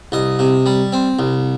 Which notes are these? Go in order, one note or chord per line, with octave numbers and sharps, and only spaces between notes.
C2 D#5
C3
G3
C4
C2